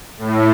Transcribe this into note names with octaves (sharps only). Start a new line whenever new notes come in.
A2